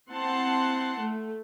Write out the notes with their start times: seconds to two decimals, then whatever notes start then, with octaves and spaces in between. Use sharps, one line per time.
0.12 C4 E4 F#5 A5 C6
1.01 A3